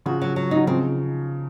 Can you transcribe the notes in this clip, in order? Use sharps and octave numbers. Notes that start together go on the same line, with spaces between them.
C#3 F3 F#4
F#3
F#3
D#4
F#3
C#3 F3 C4